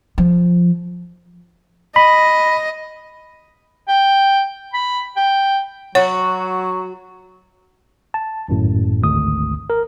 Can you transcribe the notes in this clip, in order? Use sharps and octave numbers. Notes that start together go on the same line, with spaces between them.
F3
D#5 B5
G5
B5
G5
F#3 F#4 C#5
A5
G#1 F#2 A2
G#1 D2 D#6
A#4